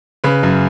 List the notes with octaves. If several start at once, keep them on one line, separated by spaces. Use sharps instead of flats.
C#3 B4 B5
F#2